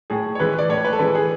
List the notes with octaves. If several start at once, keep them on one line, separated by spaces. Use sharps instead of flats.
A2 G#4
C#5
E3 G#3 B4
D5
A2 C#5
B4
A4
E3 G#3 B4
G#4